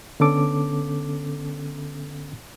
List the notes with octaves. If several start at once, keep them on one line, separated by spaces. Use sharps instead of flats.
D3 B3 C#4 A4 D6